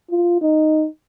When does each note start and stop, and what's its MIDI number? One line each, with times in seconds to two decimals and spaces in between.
0.10 0.41 65
0.41 0.86 63